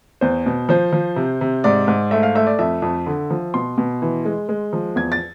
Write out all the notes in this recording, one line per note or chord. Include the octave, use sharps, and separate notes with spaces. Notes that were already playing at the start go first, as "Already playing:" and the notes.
E2 C5
B2
F3 C5
F3
C3
C3
G#2 D5
G#2
A3 E5
F5
A3 E5
D5
F2 E5
F2
D3
F3
B2 C6
B2
E3
G#3
G#3
F3
E2 G#6
A6